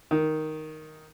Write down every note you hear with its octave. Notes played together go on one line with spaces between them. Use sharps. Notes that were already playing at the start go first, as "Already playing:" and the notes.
D#3